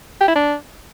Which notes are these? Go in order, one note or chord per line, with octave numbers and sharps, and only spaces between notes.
G4
E4
D4